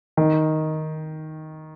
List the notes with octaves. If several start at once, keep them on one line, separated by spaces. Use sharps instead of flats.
D#3